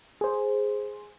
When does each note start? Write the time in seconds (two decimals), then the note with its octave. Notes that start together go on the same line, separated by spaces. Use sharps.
0.21 G#4 C5